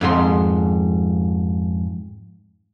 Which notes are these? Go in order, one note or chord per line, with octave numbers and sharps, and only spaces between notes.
F2 G#2 F4 C6